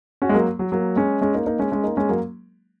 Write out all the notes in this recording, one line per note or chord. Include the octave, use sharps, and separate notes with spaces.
C#4 F#4
G#3
F#3 A#3
F#3
F#3 A#3
G#3 C#4
G#3 C#4
A#3 D#4
A#3 D#4
G#3 C#4
G#3 C#4
A#3 D#4
G#3 C#4
F#3 A#3